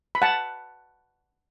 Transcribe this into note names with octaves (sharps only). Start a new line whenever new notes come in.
B5
F#5 A5